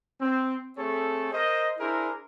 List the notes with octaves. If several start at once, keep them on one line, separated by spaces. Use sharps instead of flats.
C4
A3 C4 G#4 A4 C#5
A#4 C5 D#5
D4 E4 G#4 A#4 C5